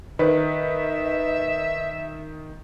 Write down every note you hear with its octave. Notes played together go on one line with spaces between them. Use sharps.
D#3 B4 D#5 E5